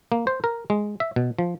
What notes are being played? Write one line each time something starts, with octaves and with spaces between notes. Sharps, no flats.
A#3
C5
A#4
G#3
E5
B2
F3